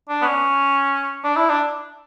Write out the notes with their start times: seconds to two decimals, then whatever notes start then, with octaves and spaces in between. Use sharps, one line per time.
0.09 D4
0.22 B3
0.25 C#4
1.24 D4
1.36 E4
1.49 D4